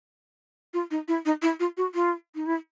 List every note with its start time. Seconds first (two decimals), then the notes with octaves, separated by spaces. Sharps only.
0.73 F4
0.91 D#4
1.08 E4
1.25 D#4
1.42 E4
1.60 F4
1.77 F#4
1.94 F4
2.35 D#4
2.46 E4